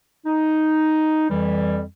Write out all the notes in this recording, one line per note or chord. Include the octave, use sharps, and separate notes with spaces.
D#4
F2 E3 G3